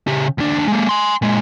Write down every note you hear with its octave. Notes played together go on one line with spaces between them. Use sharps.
C#3 G4
D#2 D4
G#3 A#3
G#5 C6
A#2 G#3